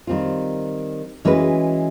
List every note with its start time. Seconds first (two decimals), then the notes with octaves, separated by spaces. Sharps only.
0.07 D#3 G3 C4 F4
1.25 E3 G#3 C#4 F#4 B4